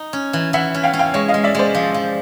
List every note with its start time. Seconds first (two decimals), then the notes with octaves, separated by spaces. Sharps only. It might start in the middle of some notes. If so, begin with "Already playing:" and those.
Already playing: D#4
0.13 C#4
0.33 E3
0.53 E3 E5 F#5
0.74 C#4
0.83 F5 G5
0.93 C#4
0.99 F5 G5
1.14 G#3 C#5 D#5
1.28 D#5 F5
1.34 G#3
1.44 D5 E5
1.55 G#3 C5 D5
1.75 F3
1.94 F3